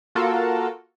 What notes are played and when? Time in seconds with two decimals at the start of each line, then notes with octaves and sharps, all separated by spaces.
0.15 A#3 F4 F#4 A4 A#4